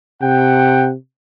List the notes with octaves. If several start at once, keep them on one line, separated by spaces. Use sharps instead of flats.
C3 F#5 G5